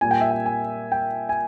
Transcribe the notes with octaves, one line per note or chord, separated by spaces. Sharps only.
A#2 G3 A#3 G#5
G5
E5
G5
G#5
G5
G#5